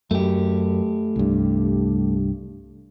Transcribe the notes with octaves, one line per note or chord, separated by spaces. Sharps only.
F#2 A3 G4
C2 G2